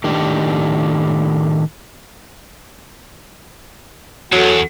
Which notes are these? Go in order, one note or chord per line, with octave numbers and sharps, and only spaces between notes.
A2 D#3 D4 G4
E2 F#3 F#4 A4